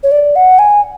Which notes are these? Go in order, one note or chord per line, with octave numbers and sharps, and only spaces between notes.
C#5
D5
F#5
G#5